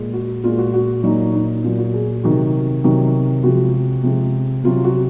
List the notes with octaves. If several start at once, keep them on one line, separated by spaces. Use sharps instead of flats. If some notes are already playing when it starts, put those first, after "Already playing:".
Already playing: A#2 G#3
F#4
A#2 G#3 F4
F#4
F#4
A#2 F#3 D#4
D#4
A#2 F#3 F4
F#4
G#4
C3 D#3 F#3 F#4
C3 D#3 F#3
C3 F3 G#3 F#4
C3 F3 G#3
C3 F#3 F4
F#4